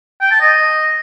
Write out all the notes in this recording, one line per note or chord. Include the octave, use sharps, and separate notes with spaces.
G5
A5
D#5